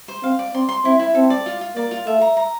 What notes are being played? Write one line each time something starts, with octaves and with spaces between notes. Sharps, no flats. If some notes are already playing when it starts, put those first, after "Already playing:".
C5
C4 F5
D5
C4 C6
C6
C4 E4
E4
C4 A4
D5
F4
F4
A#3 D5
F4
A3 E5
A#5
A#5